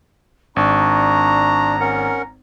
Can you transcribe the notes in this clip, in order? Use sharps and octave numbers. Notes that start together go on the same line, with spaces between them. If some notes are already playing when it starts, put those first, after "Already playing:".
G#1 D4 A#5 C#6
C#4 A#4 F#5